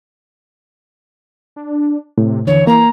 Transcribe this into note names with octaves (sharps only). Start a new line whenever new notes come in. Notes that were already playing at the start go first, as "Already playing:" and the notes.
D4
A2 C3
D#2 D3 E3 C#5
A#3 A#5